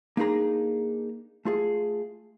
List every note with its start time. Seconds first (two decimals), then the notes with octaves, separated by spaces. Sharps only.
0.17 A#3 D4 D#4 G#4 A#5
1.45 A3 F4 G#4